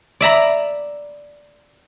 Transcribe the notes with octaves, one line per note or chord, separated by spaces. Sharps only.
D5 E5 A#5 B5